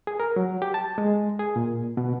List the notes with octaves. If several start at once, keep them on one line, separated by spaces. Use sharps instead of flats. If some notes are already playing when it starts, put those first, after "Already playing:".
G#4
A#4
F#3
G4
A5
G#3
G#4
A#2
B2